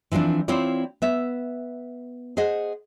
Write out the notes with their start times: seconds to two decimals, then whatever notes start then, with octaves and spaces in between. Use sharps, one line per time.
0.12 E3 F3 A#3 C4 D4
0.48 C4 E4 F4 C#5 D5
1.02 B3 E5
2.37 G#4 C5 D#5 F#5